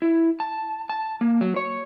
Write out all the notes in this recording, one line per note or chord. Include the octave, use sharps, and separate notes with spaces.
E4
A5
A5
A#3
F#3
C#5